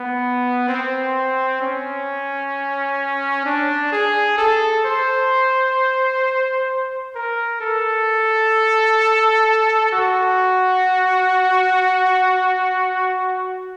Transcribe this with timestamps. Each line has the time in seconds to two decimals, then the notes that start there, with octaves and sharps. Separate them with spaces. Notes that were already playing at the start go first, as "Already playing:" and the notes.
Already playing: B3
0.68 C4
1.61 C#4
3.46 D4
3.92 G#4
4.38 A4
4.85 C5
7.15 A#4
7.61 A4
9.92 F#4